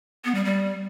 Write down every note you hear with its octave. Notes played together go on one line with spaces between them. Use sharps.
B3
G3
G3